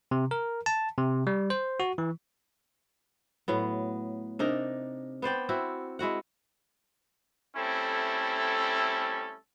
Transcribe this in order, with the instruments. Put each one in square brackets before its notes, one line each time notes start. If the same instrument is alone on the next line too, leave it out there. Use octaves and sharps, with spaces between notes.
[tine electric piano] C3
A#4
A5
C3
G3
C5
F#4
E3
[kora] A2 F#3 B3
C3 D4 D#4 A#4
B3 C5 D5 G5
C4 E4 F#4
G#3 E4 F#4 F#5
[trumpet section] G3 A3 C4 C#4 E4 A4